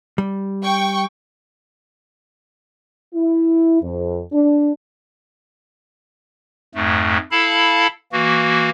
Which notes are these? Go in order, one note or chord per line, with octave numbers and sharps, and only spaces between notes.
G3
G5 C#6
E4
F2
D4
F2 G#2 A3
E4 A4 F5 A5 B5
E3 A#3 F#4